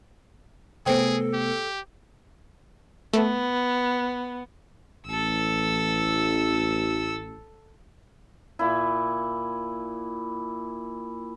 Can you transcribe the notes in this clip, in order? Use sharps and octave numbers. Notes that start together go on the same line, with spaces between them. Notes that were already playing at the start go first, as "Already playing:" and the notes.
C3 A3 B3 G#4 A4 C5 G5
G4
A3 B3
A1 A4 E6
A#2 E4